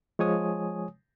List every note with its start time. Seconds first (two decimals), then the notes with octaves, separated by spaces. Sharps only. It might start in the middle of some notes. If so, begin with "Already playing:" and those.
0.19 F3 G#3 C#5 G#5 D#6